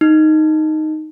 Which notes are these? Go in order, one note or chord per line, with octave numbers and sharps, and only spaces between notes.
D#4